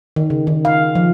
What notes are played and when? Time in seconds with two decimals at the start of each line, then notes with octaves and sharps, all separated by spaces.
0.16 D#3
0.30 C#3
0.47 D#3
0.65 F5
0.95 F3